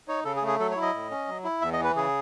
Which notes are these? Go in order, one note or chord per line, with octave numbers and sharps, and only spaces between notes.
D#4 C#5
C#3 A4
G#4
A3
G#4
F#3 A4
C#5
E4
D#5
A2
C#4
F#3
E4
E2 E5
D#5
E3
B4
C#3 G#4